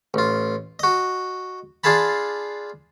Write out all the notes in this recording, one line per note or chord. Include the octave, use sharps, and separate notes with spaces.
A1 F4
F#4 D#5
D4 F4 G#4 F5 A5 B5